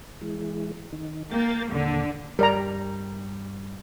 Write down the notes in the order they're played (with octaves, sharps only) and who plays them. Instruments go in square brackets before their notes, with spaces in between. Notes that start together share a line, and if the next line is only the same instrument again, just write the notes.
[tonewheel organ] E3 G#3
D#3
[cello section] A#3 [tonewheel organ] A#4 G5 A6
[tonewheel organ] D#2 A#2 [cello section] D3
[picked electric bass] G2 G3 [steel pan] A#4 D5 A#5